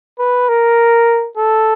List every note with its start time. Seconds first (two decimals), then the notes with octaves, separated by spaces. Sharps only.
0.19 B4
0.49 A#4
1.37 A4